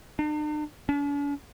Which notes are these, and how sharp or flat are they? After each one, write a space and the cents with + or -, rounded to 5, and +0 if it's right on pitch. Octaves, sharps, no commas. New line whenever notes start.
D4 +45
D4 -45